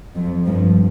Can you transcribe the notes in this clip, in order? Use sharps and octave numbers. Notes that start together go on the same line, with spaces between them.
F2 F3
G2 F3